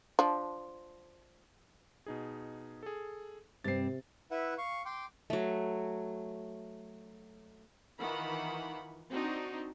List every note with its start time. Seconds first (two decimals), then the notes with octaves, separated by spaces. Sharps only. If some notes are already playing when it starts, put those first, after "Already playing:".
0.19 F3 D4
2.06 B2 D#4 G#4
2.83 G#4 A4
3.64 G2 C3 C4 A6 C7
4.31 E4 B4 E5 F#5
4.58 F5 C#6
4.85 G5 C6 D6
5.30 F#3 A3
7.99 D#3 E3 F4 F#5 B5
9.11 C4 D4 D#4 F#4